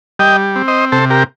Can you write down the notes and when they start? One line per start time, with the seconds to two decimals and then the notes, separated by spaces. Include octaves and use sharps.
0.19 G3 D#5 G5
0.56 C4
0.68 C5 D#5
0.92 C3 A4 C5
1.10 G4 A#4